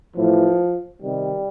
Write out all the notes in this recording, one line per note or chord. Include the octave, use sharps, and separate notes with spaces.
A2 E3 F3
C3 D#3 G3